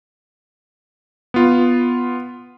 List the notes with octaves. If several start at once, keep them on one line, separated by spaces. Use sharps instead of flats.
B3 F4